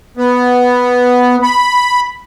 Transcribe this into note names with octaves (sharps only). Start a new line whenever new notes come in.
B3
B5